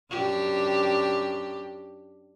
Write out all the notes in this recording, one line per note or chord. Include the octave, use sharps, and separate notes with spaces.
F#2 D4 G4